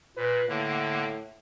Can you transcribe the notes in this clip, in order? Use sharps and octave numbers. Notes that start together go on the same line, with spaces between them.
A#2 B4
A2 D3 A#3